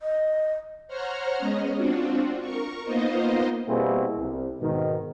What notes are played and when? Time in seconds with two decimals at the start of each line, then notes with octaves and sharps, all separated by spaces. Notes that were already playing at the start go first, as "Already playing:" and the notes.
0.02 D#5
0.88 C5 C#5 F#5 A#5 F6
1.37 G#3 B3 C#4 D#5
1.76 C4 D4 F4 F#4
2.41 A#4 C#6
2.84 A#3 B3 D#4 F4 C5 D#5
3.68 B2 G3 A#3 C4 E4 G#4
4.19 C2
4.61 G#2 B2 D#3